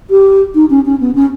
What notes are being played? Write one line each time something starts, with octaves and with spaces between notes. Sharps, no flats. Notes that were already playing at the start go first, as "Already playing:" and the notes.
G4
D#4
C#4
C#4
B3
C#4